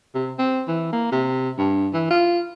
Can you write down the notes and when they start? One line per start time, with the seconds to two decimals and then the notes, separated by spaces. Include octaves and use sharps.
0.15 C3
0.39 C4
0.68 E3
0.93 A#3
1.12 C3
1.58 G2
1.94 E3
2.11 F4